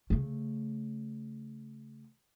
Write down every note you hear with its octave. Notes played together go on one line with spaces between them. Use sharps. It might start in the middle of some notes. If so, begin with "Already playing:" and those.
C#3 A3